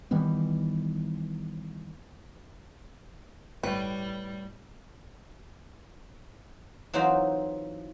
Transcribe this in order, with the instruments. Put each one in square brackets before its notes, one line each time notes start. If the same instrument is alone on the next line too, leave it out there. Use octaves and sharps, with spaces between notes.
[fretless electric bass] D#3 E3 G3 B3
[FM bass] G1 [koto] A2 [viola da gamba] G3 [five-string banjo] B4
[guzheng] E3 F#3 C4 D#4 F4 C5